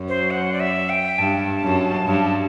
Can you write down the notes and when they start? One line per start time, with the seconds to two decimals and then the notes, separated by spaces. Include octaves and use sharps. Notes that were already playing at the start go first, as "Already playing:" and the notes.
Already playing: F#2
0.09 C5
0.31 F#5
0.53 D5
0.60 E5
0.89 G5
1.19 G2 A5
1.63 F#2
2.07 G2